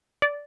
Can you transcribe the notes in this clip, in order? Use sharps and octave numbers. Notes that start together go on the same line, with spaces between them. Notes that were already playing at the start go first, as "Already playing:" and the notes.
D5